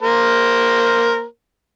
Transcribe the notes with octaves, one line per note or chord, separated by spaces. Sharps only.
A#3 A#4 C5